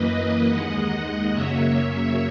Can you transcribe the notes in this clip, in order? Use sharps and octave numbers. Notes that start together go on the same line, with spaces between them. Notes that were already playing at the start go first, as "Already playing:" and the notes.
Already playing: F#2 E3 A#3 B4 D#5
D#2 D#3 G#3 D#5 F#5
F#2 C#3 F#3 A#3 C#5 E5